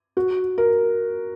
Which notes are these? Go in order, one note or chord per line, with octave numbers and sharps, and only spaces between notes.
F#4
A#4